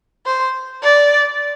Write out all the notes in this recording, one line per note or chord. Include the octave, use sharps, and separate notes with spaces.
C5
D5